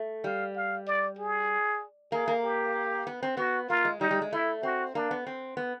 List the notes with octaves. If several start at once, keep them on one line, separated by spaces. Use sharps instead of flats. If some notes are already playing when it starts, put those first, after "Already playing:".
Already playing: A3
G3 F5
F5
D5
G#4
A#3 G#4
A#3
G4
B3
C4
B3 F#4
A#3 F4
G#3
G3 D#4
G3
G#3
A3 E4
C4 F#4
A#3 D4
B3
C4
B3